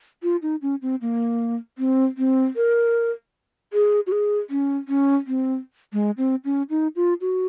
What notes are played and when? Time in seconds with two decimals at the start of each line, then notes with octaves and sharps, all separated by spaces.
0.23 F4
0.42 D#4
0.62 C#4
0.82 C4
1.01 A#3
1.78 C4
2.18 C4
2.56 A#4
3.73 G#4
4.07 F#4
4.12 G#4
4.50 C#4
4.88 C#4
5.27 C4
5.93 G#3
6.18 C4
6.45 C#4
6.70 D#4
6.96 F4
7.21 F#4